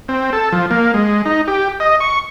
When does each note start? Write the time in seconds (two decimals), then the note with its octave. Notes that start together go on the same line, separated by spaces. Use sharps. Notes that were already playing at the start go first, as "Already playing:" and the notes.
0.09 C4
0.33 A4
0.52 F3
0.71 A#3
0.94 G#3
1.25 D#4
1.48 G4
1.80 D#5
2.00 C#6